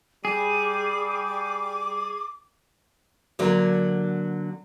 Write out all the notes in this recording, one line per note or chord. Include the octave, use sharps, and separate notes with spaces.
G3 G#4 D6
D3 F#3 A#3